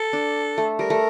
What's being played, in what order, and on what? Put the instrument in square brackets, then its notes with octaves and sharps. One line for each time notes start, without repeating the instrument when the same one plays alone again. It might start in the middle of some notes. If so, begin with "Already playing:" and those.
Already playing: [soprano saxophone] A4
[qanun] D4
A3
[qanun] G3 [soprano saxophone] A#4
[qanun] A3